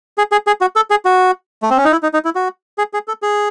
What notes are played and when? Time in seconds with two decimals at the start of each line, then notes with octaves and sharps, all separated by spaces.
0.18 G#4
0.32 G#4
0.47 G#4
0.61 F#4
0.76 A4
0.90 G#4
1.05 F#4
1.63 A3
1.70 C4
1.77 C#4
1.85 D#4
1.92 E4
2.03 D#4
2.14 D#4
2.25 E4
2.35 F#4
2.78 G#4
2.94 G#4
3.08 A4
3.22 G#4